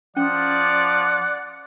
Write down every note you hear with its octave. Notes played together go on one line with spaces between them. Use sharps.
F3 C#4 D5 F#5